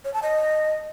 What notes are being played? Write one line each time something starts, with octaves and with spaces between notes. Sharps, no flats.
C#5
A5
D#5